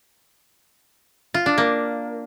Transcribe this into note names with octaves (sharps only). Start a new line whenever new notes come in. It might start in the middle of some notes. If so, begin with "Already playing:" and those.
F4
D4
A#3